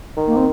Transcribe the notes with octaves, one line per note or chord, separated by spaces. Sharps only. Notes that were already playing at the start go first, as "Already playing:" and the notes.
D#3
A#3
C4